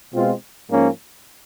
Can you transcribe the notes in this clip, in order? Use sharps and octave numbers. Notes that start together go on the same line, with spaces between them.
B2 G#3 C4 F4
G#2 F3 A#3 C#4